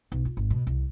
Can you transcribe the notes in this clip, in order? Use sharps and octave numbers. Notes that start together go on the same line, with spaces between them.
B1
F4
G#1
B2
C2